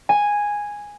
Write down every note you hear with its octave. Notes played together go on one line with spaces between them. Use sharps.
G#5